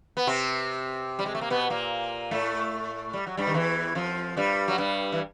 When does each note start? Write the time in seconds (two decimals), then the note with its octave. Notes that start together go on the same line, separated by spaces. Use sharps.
0.17 B3
0.27 C3 C4
1.19 G3
1.26 G#3
1.35 A3
1.41 A#3
1.50 B2 B3
1.70 A#2 A#3
2.31 A2 A3
3.13 G3
3.27 F#3
3.37 G2 G3
3.47 D#3
3.54 E2 E3
3.95 F2 F3
4.37 G2 G3
4.68 F#3
4.78 G2 G3
5.12 E3